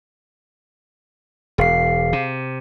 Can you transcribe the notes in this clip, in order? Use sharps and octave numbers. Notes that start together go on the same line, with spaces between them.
E1 G#4 F5 C7
C3